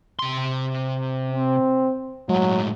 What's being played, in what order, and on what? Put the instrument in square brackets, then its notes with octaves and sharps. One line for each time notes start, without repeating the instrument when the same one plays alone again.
[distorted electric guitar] C3 C6
[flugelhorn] C4
[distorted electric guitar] A2 G#3 [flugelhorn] F#3